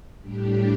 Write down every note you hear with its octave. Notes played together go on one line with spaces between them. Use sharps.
A2 G3 D4 G4